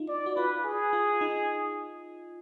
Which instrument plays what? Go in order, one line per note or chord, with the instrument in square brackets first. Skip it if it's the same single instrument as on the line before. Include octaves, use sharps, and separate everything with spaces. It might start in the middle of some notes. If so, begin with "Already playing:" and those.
Already playing: [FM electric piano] D#4 F4
[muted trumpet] D5
[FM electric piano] F#4
[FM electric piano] F4 [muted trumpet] B4
[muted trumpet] G#4
[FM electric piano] F4
D#4